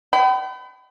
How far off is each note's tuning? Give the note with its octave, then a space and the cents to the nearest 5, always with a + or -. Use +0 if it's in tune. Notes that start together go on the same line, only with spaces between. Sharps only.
G5 -45 B5 +30